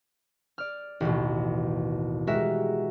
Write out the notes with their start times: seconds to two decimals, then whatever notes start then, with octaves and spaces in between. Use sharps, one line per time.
0.58 D5 F6
1.00 A1 D#2 B2
2.27 G3 G#3 F#4 A#4 E5